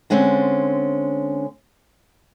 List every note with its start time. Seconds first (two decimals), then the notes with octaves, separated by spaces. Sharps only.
0.10 D3 G#3 C4 C#4